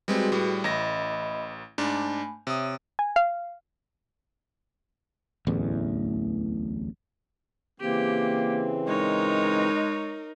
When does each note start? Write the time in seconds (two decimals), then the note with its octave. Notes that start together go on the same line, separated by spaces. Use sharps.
0.08 G3 G#3 C4 F#4 G#4 B4
0.32 A2 G3
0.64 A1 D#5 E5 B5 A#6
1.78 G#2 A3 D4 G#5 B5
2.47 C3 C#5 E5 D#6
2.99 G#5
3.16 F5
5.47 D1 A1 E2
7.80 C#3 E3 A#3 C4 G4
8.88 G#3 D#4 A#4 C#5